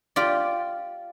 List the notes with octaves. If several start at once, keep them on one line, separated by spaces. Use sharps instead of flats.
F4 G4 D5